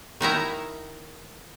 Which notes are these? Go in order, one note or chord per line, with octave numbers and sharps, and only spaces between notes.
D#3 D#4 E4 A#5